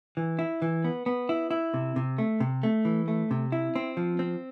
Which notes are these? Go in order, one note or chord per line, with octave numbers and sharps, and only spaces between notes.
E3
E4
E3
B3
B3
E4
E4
C3
C3
A3
C3
A3
E3
A3
C3
E4
C4
F3
C4